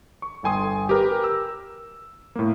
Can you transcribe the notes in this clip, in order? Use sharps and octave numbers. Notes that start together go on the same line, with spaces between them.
C#6
G1 A4 G5 G#5 C6 D#6
G4 A#4 B4
E6
A2 A#3